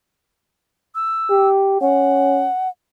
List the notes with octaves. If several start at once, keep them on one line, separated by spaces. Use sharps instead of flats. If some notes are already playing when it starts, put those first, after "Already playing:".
E6
G4
C#4 F#5